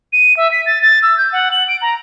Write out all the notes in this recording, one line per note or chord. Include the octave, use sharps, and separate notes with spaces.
D#7
E5
B6
A6
A6
E6
G6
F#5
F#7
D7
A#5